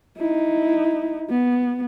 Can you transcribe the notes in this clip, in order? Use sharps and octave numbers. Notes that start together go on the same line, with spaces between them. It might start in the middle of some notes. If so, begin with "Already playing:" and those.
D#4 E4
B3